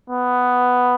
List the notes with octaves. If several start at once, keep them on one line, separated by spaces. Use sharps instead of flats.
B3